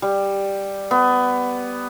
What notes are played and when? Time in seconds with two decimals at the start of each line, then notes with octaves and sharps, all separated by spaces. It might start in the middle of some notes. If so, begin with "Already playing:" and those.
0.02 G3
0.91 B3